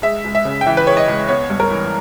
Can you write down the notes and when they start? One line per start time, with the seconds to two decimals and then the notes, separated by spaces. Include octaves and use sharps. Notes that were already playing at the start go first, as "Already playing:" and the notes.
0.02 G#3 E5
0.24 C#2
0.35 E5
0.45 C#3
0.61 G5
0.66 E3 E5
0.77 B4
0.86 G#3 C#5
0.97 D#5
1.08 C#2
1.29 B3 C#5
1.50 G2
1.60 A#4
1.71 E3